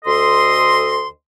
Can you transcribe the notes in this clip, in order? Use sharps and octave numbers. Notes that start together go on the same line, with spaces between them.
D2 A4 D#5 C6